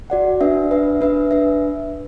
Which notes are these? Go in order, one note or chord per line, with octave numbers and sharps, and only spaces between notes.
F#4 D5 F#5
D4 B4 E5
D4 B4 E5
D4 B4 E5
D4 B4 E5